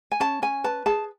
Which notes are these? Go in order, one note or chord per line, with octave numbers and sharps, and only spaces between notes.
G#5
C#4 A5
C#4 G#5
B4 A5
G#4 A5